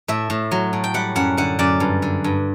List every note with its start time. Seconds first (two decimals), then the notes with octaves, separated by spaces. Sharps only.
0.08 A2 E5
0.30 A2
0.51 F#3
0.73 A2
0.84 G5
0.94 G3 F#5
1.16 F#2 F#5
1.37 D3 F#5
1.59 F#2 D5
1.80 G2
2.02 D3
2.24 G2